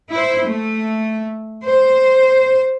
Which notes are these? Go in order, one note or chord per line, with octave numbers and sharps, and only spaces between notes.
E4 C5
A3
C5